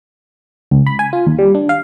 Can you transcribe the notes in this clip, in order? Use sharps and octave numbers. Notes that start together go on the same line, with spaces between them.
C#2
B5
G#5
F4
D#2
G3
D4
F5